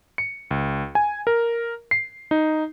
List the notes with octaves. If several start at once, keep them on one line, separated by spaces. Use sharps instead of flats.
C#7
C#2
G#5
A#4
C7
D#4